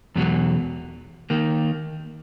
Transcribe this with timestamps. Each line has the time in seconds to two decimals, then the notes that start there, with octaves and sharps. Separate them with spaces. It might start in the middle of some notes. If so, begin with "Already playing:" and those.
0.16 E2 B2 F#3
1.30 D#3 A#3